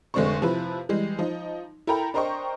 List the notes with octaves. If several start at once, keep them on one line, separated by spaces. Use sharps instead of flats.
F1 D3 G#3 D4 C5 C#6
C3 F3 C4 E4 B4
E3 G3 G#3
F3 D#4
E4 A4 A#4 G5 A#5 B5
D4 A#4 C5 D#5 G5 C#6